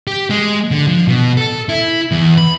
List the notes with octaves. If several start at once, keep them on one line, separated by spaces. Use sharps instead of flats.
G4
G#3
D3
F3
B2
A4
E4
E2
B5